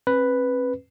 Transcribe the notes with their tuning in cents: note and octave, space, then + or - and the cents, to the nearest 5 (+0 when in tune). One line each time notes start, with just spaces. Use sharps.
C4 +45 B4 +0